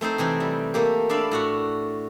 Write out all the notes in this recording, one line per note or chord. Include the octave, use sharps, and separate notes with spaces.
A3 C4 D#4 C5
C3 E3 C4 D#4
G3
A3 A#3 G4
D4 D5 E5 F5 B5
A2 F#4 F#5